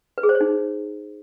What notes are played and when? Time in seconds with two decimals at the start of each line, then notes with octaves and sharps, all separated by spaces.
0.18 B4
0.23 G#4
0.29 C5
0.35 C#5
0.41 D#4